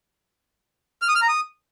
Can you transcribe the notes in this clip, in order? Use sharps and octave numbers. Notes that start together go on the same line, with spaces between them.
F6
D#6
F6
A#5
D#6